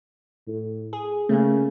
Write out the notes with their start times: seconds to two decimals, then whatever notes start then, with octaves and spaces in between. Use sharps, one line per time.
0.48 A2
0.93 G#4
1.29 C#3 A3 A#3